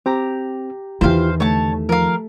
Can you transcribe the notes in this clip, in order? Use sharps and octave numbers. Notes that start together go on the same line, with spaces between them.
C4 G4 A#5
E2 D#3 E4 F4 G4 C5 F5
D3 A3 C#5 A5
F3 A#4 F5